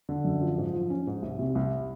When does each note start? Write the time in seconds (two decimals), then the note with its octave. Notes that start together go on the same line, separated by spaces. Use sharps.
0.09 D3
0.25 F#2
0.41 F3
0.58 G#2
0.74 F3
0.90 C#4
1.07 G#2
1.22 C2
1.39 C3
1.55 C2